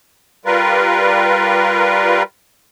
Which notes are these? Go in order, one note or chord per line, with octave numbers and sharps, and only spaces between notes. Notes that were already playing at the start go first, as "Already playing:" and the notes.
G3 F4 A#4 B4